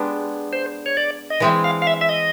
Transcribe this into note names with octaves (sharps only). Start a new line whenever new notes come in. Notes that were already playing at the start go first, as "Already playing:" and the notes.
Already playing: G#3 B3 D4 G4
C5
C#5
D5
D#5
E3 G#3 C4 E5
F5
F5
E5
E5
D#5